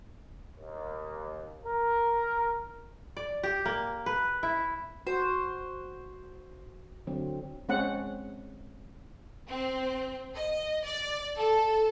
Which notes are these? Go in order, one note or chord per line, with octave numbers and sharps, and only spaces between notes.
D#2
A#4
D5
G4
A#3
B4
E4
F#4 C5
D3 F#3 C4
G#3 C4 C#4 F#5
C4
D#5
D5
A4